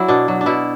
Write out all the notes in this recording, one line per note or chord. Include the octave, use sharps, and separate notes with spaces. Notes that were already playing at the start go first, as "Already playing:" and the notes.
Already playing: F#3 E4 D5
B2 D4
F#3
D4
B2 E4